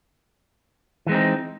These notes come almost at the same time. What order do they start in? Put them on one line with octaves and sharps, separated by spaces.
E3 G#3 C4 D#4